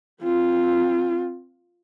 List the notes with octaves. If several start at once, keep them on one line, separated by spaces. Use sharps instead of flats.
C4 F4